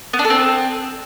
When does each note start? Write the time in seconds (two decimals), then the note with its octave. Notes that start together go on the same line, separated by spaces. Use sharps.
0.13 B3
0.19 D4
0.25 A4
0.30 C4